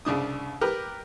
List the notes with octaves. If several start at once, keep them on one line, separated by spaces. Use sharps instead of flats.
C2 C#3 D4 D#6
G4 A#4 B4